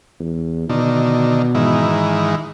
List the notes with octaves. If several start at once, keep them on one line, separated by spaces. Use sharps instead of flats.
E2
B2 D3 D#3
G#2 D#3 E3